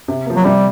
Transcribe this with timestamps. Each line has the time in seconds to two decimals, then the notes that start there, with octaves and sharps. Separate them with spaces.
0.08 C3
0.26 F3 A#3
0.36 F#3
0.45 C3 G3